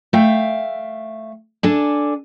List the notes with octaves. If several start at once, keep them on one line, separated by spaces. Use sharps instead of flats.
A3 E5 F5 G5
D4 A4 G#5